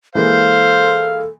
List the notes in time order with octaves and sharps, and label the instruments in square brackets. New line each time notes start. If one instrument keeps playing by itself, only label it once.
[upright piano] E3 G#3 A#3 [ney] A4 [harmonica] C5 [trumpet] F5